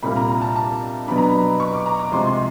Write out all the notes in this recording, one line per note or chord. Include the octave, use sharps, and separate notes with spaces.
C2 A#2 G3 A#3 B5
A#5
A#5
A5
A5
B2 F#3 B3 D4 B5
A#5
B5
C#6
D6
A#5
D6
C2 C3 F3 G#3 C6
C6